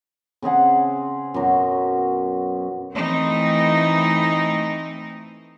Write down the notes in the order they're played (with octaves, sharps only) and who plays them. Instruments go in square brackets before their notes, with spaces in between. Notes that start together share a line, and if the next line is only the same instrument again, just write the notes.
[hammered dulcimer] C#3 C4 G#4 F#5
F#2 B2 F#3
[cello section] E3 A3 C4 D#4 E4